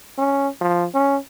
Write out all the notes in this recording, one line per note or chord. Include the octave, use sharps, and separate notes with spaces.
C#4
F3
C#4